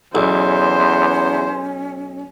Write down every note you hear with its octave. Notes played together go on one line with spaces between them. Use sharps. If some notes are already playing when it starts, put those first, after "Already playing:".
B1 E2 C#4 C5